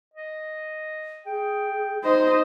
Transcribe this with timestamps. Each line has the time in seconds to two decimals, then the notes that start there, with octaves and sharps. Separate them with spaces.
0.14 D#5
1.26 G#4 G5
2.04 D#4 C5 D#5